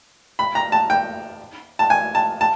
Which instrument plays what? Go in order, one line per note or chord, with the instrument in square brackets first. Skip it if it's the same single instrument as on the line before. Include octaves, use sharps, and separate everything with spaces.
[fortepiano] B5
A#5
A5
G5
A5
G#5
A5
A5